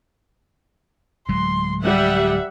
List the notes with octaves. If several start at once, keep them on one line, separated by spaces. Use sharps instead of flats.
D1 F#3 G#3 C6
G3 E5 F#5